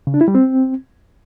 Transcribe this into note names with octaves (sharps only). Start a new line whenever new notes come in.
C#3
D4
E4
G3
C4